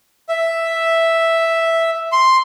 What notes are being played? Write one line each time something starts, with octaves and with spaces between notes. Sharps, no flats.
E5
C6